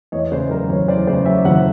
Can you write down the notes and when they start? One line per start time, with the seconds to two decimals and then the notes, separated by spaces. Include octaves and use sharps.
0.12 E2 C#5 D#5
0.32 C#3 C5 D5
0.50 F#3 A#4 C5
0.69 F#1 B4 C#5
0.88 E2 C5 D5
1.07 C#3 C5 D5
1.25 F#3 D5 E5
1.45 F#1 E5 F#5